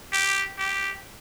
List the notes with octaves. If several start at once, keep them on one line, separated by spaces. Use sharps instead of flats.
G4
G4